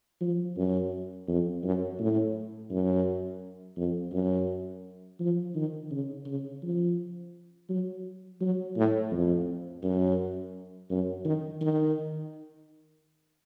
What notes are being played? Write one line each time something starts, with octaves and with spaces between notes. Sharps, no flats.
F3
F#2
F2
F#2
A2
F#2
F2
F#2
F3
D#3
C#3
C#3
F3
F#3
F#3
A2
F2
F#2
F#2
D#3
D#3